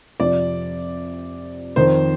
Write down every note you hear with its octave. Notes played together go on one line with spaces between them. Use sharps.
F2 C3 F3 D5
F2 D#3 C5